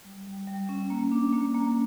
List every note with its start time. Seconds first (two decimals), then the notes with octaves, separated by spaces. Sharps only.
0.05 G3
0.27 G3
0.48 G3
0.69 C#4
0.90 A#3
1.12 D4
1.33 A#3
1.54 A#3